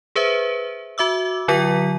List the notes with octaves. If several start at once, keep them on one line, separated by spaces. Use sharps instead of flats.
G#4 B4 C5 E5
F#4 E5 D6 E6
D3 F#3 F4 G5 B6 D#7